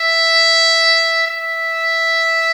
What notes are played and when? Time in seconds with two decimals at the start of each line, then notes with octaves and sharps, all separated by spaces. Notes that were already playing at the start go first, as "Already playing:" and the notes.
Already playing: E5
1.27 E5